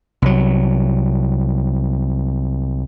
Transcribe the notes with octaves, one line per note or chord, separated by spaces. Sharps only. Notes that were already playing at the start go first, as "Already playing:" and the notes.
C2 F#3